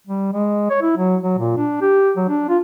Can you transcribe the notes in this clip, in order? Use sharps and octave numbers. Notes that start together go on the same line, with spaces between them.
G3
G#3
C#5
E4
F#3
F#3
A#2
D4
G4
F#3
D4
F4